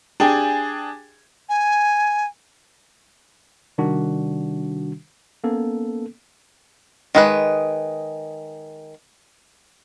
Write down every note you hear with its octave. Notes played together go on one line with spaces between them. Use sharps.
D4 G4 G#4 G5 G#5
G#5
C3 D#3 G3 D4 F#4
A#3 B3 C#4 A4
D#3 G#3 B4